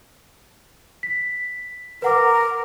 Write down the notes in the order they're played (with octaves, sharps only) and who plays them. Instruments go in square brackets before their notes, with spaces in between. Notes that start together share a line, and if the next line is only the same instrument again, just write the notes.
[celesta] B6
[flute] A#4 [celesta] B4 F#5 D6